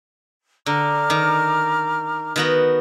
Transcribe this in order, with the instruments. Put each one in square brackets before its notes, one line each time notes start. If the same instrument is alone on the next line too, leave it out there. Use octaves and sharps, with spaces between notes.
[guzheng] D3 [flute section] A#5 D6 F6
[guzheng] D#3
D#3 B3 F#4